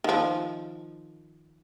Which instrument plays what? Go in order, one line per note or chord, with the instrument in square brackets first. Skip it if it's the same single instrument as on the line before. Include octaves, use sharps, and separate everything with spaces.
[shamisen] D#3 F3